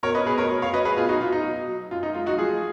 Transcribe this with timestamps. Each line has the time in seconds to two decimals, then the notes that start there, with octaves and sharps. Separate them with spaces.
0.03 B2 A#4 C#5
0.15 B4 D#5
0.26 B2 G#4 B4
0.38 A#4 C#5
0.50 F#3
0.62 C#5 F5
0.73 F#3 B4 D#5
0.85 G#4 B4
0.97 B2 F4 G#4
1.09 D#4 F#4
1.20 B2 F4
1.32 D#4
1.44 F#3
1.68 F#3
1.91 F#2 F4
2.03 D#4
2.15 G#3 F4
2.26 D#4 F#4
2.38 F3 F4 G#4